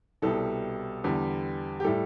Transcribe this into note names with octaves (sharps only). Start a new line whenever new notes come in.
C2 B2 G3 A4
E2 D3 G3
G4
A2 G3 A4